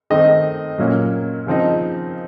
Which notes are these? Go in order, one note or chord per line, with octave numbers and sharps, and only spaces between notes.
D#3 A3 C4 D#4 D#5
A#2 F#3 A#3 C#4
C#3 F3 C4 D#4